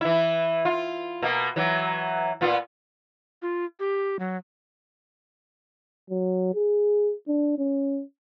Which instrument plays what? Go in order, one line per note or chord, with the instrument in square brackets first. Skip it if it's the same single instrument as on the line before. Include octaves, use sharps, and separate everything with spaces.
[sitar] E3 E4
F4
B2 A#3
E3 F#3
A#2 B3 F4
[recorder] F4
G4
F#3
[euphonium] F#3
G#4
D4
C#4